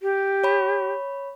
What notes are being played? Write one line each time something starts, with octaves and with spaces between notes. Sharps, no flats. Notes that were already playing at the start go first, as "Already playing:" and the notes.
G4
C#5 B5